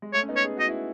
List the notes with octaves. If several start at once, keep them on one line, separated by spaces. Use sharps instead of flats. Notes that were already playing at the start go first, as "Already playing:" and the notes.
G#3
A3 C#5
C#4
B3 D#4
C#5
G#4
F#4 D#5
E4